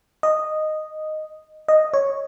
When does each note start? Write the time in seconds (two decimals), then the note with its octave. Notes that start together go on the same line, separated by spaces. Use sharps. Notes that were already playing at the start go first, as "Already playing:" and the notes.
0.23 D#5
1.68 D#5
1.94 C#5